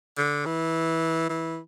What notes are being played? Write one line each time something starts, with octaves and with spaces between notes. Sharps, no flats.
D3
E3
E3